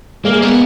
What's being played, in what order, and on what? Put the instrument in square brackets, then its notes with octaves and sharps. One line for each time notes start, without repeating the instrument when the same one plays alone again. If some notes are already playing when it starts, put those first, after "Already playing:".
[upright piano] G#3 [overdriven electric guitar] A#3
[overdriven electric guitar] B3